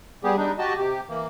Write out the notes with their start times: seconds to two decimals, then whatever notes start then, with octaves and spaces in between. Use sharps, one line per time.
0.24 G3 B3 G4 G#4
0.37 G3 D4 D#4
0.58 F#4 G4 D#5 A5
0.77 C3 G4
1.09 E3 A#3